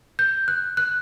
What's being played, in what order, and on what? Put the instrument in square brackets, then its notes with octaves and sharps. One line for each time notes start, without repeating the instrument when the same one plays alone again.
[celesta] G6
F#6
F#6